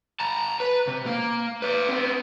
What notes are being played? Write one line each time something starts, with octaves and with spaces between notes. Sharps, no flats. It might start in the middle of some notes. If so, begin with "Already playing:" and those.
A5 A#5
B4
C3
A#3
B4 D5
B3 C4